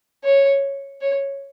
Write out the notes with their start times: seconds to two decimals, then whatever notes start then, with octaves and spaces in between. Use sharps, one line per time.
0.24 C#5
1.01 C#5